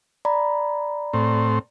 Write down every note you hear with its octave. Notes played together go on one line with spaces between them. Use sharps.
D5 A#5 B5
A2 C4